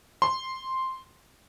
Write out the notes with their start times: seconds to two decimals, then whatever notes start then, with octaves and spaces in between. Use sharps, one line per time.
0.22 C6